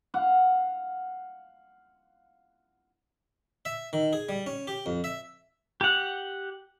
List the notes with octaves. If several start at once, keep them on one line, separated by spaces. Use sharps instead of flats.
F5 F#5
E5
D#3
G#4
G3
C#4
G4
F2
E5
G4 F#5